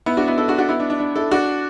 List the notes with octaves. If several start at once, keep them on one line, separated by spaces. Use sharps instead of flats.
B3 E4
D4 F#4
B3 E4
E4 A4
D4 F#4
D4 F#4
B3 E4
D4
D4
D4
E4 A4
D4 F#4